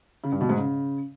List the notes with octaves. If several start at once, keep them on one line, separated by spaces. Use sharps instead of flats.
C#3
G2
B2
G#2
C#3